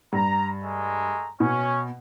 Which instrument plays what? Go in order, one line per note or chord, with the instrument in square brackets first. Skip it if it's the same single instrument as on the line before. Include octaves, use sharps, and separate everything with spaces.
[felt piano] G2 [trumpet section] A#5
[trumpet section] G#3 A3 A#5
[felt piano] B2 [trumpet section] C#4